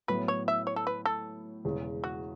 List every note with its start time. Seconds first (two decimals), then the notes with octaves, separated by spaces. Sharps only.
0.08 A2 F#3 B3 B4
0.28 C#5
0.48 E5
0.67 C#5
0.76 A4
0.87 B4
1.05 A4
1.64 E1 E2 C#3
2.04 F#4